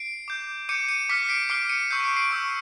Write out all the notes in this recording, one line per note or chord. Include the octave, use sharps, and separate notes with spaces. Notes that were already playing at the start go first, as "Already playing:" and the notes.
Already playing: C7 D7
D6 G6
D6 G6 C#7 D#7
C#7 D#7
D6 F6 B6 C#7
C7 D7
D6 F6 C7 D7
C#7 D#7
C#6 E6 G6 C7
C7
C7 D7
C#6 E6 G6